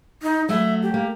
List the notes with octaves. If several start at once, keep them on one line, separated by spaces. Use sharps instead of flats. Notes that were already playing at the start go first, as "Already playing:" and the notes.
D#4
F#3 A3 F#4 E5
G4
A#3